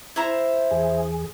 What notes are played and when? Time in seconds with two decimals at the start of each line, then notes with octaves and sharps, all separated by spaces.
0.16 E4 C5 A#5
0.71 E2 G#4